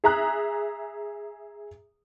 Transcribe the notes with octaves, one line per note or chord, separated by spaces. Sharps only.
G#4 E5 A#5 D#6 F#6